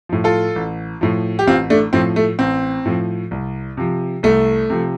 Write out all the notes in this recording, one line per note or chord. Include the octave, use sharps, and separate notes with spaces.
A2 F3
F4 A4
A1
A2 F3
G4
A1 C4 F4
A3 D4
A2 F3 C4
A3
A1 C4
A2 F3
C2
C3 F3
C2 A3
C3 F3